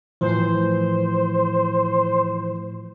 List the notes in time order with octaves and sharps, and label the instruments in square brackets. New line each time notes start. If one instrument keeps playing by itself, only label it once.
[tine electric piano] A2 E3 F3 [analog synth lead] C5